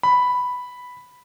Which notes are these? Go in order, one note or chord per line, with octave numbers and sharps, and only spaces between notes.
B5